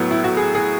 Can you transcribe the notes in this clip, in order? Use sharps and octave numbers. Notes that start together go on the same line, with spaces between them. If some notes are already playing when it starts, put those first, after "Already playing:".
Already playing: A2 F#3 B3
E4
F#4
G#4
G#4